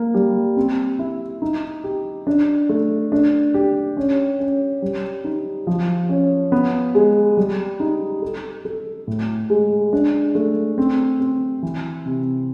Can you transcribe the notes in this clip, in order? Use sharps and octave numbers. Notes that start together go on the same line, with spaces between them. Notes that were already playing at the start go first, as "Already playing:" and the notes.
Already playing: A#3
G3
C4
E4
D#4
G4
D4
A3
D4
G4
C#4
C#4
G3
D#4
F3
C#4
B3
G#3
G3
D#4
A4
A4
A2
G#3
D4
A3
C4
C4
E3
C3